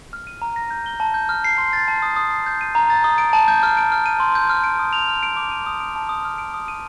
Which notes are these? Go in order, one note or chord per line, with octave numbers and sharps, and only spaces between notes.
F6
D#7
A#5
A#6
G6
G7
A5
G6
F6
C7
C6
A6
A5
D#6
D#6
C7
G6
D#7
A#5
A6
D#6
D7
A5
G6
F6
D7
F6
D#7
C6
G6
F6
D7
D#6
F7
F6
D7
D6
D#7
D#6
D7
A5
D#6
F6
D7
D#6
D#7